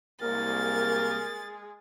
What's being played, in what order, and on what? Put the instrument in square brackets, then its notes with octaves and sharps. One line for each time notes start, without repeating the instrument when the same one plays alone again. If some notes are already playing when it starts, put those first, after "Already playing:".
[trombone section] C2 A#3 [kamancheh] G#3 G#4 [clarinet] A#4 [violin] A6